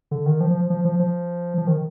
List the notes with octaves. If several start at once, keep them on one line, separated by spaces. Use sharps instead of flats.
D3
D#3
F3
F3
F3
F3
F3
F3
D#3